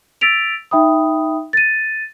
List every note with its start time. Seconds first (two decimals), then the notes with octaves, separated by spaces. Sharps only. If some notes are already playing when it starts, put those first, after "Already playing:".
0.21 E6 A6 B6 D7 F7
0.71 D#4 E5 G5 B5 D#6
1.53 A6 D#7